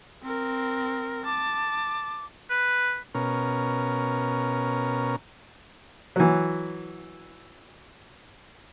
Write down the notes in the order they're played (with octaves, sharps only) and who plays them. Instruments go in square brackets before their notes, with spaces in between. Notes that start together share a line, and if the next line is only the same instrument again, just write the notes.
[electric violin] C4 A#4
[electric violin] A5 [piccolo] D6
[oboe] B4
[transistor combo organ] B2 C#4 A#4
[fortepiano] E3 F#3